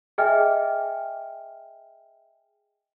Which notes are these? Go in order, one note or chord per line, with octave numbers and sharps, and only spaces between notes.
G#4 D#5 E5 G5 G#5 F6